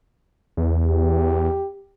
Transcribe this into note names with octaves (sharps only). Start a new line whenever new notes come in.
E2
G4